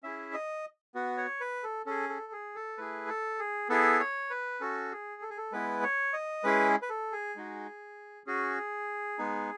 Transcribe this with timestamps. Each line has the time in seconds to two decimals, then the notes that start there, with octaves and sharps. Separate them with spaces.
0.03 C#4 E4 G#4 E5
0.33 D#5
0.95 B3 F#4
1.17 C#5
1.41 B4
1.63 A4
1.86 C#4 G#4 A4
2.09 A4
2.32 G#4
2.55 A4
2.78 A3 E4 G#4 B4
3.08 A4
3.39 G#4
3.69 B3 E4 G#4 A4
4.00 C#5
4.30 B4
4.61 C#4 F#4 A4
4.92 G#4
5.22 A4
5.30 G#4
5.37 A4
5.52 G#3 B3 E4 B4
5.83 C#5
6.13 D#5
6.44 G#3 C#4 E4 G#4 B4
6.82 B4
6.90 A4
7.12 G#4
7.36 G#3 D#4 F#4
8.27 C#4 F#4 G#4
9.18 G#3 B3 D#4